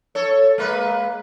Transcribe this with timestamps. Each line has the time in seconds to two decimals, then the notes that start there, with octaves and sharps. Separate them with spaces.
0.15 A4 C#5
0.58 G#3 A#3 B4